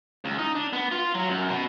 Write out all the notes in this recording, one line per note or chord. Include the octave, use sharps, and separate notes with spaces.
C#2
D#4
D4
B3
F4
F#3
F#2
B2